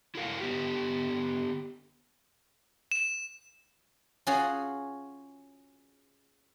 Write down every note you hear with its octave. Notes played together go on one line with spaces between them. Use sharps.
E4 F#4 A4 A#4 F5
D3 B3 G4
E7
C#4 F4 F#4 G#4 C#5